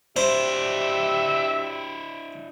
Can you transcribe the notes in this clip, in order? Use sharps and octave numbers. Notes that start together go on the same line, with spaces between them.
D4 E4 G4 C5 E5